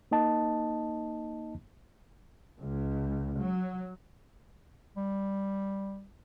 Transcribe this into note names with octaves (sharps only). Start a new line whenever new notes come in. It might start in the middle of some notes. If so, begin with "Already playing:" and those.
A#3 D#4 D#5 A5
C#2
F#3
G3